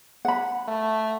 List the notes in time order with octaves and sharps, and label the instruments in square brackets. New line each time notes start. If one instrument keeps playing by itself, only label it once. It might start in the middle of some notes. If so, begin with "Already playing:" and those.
[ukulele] F#5 B5
[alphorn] A3